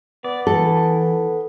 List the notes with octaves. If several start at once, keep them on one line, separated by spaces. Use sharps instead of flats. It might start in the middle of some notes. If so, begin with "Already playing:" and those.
B3 D5
E3 A4